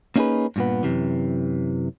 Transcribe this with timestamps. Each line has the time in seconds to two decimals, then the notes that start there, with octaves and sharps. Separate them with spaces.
0.16 A#3 C#4 D#4 G4 G#4 B4
0.56 G2 A#2 B3
0.83 F#2 C3 E3